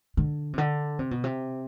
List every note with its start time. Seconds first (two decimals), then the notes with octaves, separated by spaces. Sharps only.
0.17 D3
0.53 C3
0.58 D3
0.99 C3
1.11 B2
1.24 C3